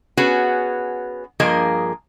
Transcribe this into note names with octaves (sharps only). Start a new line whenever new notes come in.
B3 C#4 F#4 G#4 B4
G2 F3 A#3 G#4 A#4 D#5